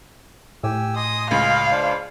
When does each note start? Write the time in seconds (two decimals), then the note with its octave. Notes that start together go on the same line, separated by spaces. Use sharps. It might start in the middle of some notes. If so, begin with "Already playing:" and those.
0.64 A2 G4 G#5 E6
0.96 D#5 G#5 C6 D#6
1.31 C#2 F5
1.71 D4 C5